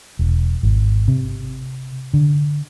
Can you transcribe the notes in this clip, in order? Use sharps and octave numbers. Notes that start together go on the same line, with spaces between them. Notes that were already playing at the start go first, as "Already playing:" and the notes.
E1
G#1
C3
D3